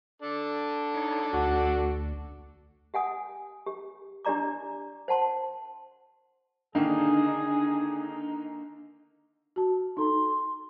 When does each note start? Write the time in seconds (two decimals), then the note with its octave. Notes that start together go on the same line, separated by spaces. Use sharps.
0.22 D4 A4
0.94 D#4 C#5
1.33 D2 F#4
2.94 G4 F#5 G#5 D#6
3.66 G4
4.25 D4 E4 G4 D5 A#5 D6
5.08 C5 F#5 A5 C6
6.75 D3 D#3 A#3 D4 D#4 G#4
9.56 F#4 A5
9.97 D#4 A4 A#5 C6